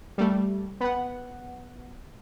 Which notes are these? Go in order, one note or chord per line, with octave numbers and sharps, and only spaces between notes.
G3 A3
B3 F#5